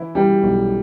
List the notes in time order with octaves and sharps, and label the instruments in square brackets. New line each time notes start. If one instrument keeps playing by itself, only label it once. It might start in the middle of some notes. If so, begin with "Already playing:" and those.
Already playing: [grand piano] E3 E4
E3 G3 G4
B1